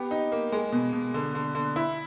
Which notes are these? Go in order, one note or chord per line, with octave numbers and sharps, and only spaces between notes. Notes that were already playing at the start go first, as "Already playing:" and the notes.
Already playing: B3 G4
D#4
A#3
G#3
B2
B2
D3
D3
D3
E4